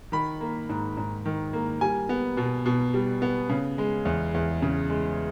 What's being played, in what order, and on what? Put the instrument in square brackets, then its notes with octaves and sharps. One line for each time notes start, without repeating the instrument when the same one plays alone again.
[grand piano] D#3 B5
A#3
G#2
G#2
D#3
A#3
G3 G#5
B3
B2
B2
G3
B3
C#3
G#3
E2
E2
C#3
G#3